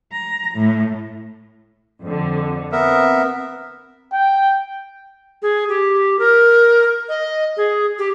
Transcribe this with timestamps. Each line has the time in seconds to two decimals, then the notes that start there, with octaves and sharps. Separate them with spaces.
0.13 A#5
0.54 A2
2.01 F2 D3
2.72 B3 C4 A#4 E5
4.13 G5
5.42 G#4
5.69 G4
6.19 A#4
7.09 D#5
7.57 G#4
7.99 G4